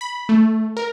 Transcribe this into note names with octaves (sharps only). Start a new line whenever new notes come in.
B5
A3
A#4